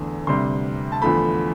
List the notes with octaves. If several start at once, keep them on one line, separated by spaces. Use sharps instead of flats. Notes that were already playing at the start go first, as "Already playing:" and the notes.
Already playing: E2 D3 A3
D2 C3 G3 C6
A5
E2 D3 F3 A3 B5